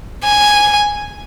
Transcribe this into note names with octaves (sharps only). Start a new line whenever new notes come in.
G#5